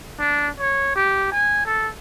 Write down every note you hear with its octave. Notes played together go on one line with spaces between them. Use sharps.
D4
C#5
G4
G#5
A4